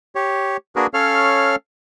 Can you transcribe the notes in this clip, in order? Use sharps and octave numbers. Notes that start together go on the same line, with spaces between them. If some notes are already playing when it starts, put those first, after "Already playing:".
G4 C#5
A#3 D4 F#4 G#4 A#4 B4
C#4 A4 C#5 F5 F6